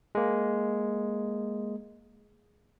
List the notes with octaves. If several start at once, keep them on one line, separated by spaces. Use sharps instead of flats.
G#3 A#3